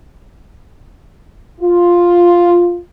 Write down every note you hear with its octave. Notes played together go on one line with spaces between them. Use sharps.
F4